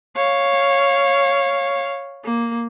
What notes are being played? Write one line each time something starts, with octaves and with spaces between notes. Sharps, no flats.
C#5 F5
A#3